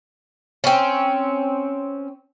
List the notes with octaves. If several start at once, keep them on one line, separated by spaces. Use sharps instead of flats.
C4 C#4